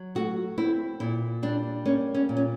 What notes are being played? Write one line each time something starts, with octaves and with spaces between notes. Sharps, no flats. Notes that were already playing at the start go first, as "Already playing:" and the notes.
Already playing: F#3
A3 F#4
C4 E4
A#2 E4
G3 D4
A#3 C#4
C#4
A#2
C#4